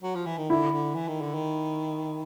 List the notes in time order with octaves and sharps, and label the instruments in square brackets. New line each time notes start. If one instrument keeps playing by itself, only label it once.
[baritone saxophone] F#3
F3
E3
D#3
[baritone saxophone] D3 [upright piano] E4
[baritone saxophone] D3
E3
D#3
D3
D#3